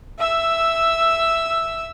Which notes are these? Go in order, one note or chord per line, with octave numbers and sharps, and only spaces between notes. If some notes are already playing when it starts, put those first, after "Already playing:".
E5 E6